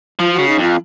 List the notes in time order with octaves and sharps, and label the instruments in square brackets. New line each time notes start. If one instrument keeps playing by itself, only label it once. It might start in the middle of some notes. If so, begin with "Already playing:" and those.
[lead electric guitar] F3 [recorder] F4
[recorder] F#4
[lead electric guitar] C#3
[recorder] D#4
[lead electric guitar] F2 [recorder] F4